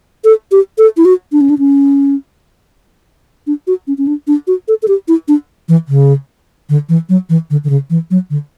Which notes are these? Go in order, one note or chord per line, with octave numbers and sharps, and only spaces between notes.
A4
G4
A4
E4
F#4
D4
C#4
D4
C#4
D4
F#4
C#4
C#4
D4
D4
F#4
A4
A4
G4
E4
D4
E3
C#3
D3
E3
F#3
E3
D3
D3
C#3
E3
F#3
D3